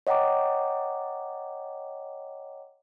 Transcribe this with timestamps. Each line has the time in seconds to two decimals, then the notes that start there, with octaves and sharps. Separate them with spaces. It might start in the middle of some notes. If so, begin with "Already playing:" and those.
0.07 C#5 D#5 F#5 G5 A#5 D6